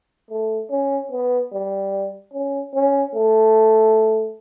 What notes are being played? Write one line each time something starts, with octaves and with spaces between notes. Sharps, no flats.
A3
C#4
B3
G3
C#4
C#4
A3